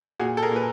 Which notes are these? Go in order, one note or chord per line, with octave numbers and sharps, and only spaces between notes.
A#2 F#4 G#4
A4
G#4 A#4
A#2
B4